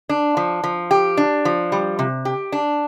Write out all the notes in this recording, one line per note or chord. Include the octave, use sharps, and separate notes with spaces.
D4
F3
F3
G4
D4
F3
G3
C3
G4
D4